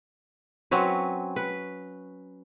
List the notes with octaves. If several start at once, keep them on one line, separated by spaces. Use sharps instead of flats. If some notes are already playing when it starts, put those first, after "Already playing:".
F#3 C4 C#4 B4
B4